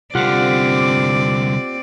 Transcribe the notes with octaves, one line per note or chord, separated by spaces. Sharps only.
C2 D3 C4 F4 G4 D5 F#5